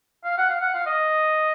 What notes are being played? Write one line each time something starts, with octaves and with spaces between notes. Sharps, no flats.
F5
F#5
F5
F#5
F5
D#5